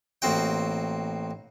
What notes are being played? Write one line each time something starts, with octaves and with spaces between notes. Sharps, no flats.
A1 A#3 C4 F#4 G5